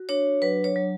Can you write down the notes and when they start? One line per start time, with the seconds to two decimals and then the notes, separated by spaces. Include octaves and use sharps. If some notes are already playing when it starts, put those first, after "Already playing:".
Already playing: F#4
0.09 D4 C#5
0.42 F#3 B4
0.64 C#5
0.76 F#3